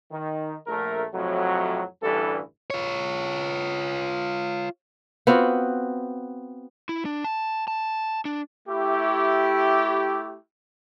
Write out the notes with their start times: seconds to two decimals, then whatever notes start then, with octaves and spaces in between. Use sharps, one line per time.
0.12 D#3
0.67 A#1 A3 A#4
1.14 F2 A2 C3 F#3
2.03 A1 D2 G2 E3 G3 A4
2.70 F4 C#5
5.27 B3 C4 F4 F#4
6.89 E4
7.05 D4
7.24 A5
7.68 A5
8.25 D4
8.68 A3 E4 G4